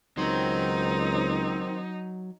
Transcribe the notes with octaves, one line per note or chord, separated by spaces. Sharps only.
C#2 D#3 F#3 C4 D#4